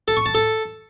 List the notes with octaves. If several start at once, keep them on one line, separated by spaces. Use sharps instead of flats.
A4
C#6
A5
A4